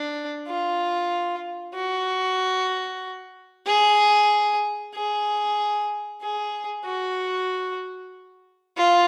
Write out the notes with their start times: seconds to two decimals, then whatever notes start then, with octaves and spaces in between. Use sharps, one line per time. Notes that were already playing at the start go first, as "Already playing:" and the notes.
Already playing: D4
0.48 F4
1.75 F#4
3.66 G#4
4.95 G#4
6.22 G#4
6.85 F#4
8.77 F4